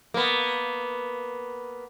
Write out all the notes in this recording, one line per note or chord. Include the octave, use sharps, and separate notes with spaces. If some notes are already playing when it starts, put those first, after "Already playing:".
A#3 B3